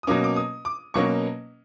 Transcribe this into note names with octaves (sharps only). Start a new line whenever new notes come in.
D#6
B2 F#3 A#3 C#4 D6
D6
D#6
D6
B2 F#3 A#3 C#4 C#6